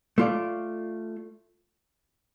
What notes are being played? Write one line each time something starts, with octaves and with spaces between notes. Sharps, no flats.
A3 F4 D5